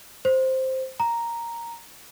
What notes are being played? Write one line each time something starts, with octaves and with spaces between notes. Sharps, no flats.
C5
A#5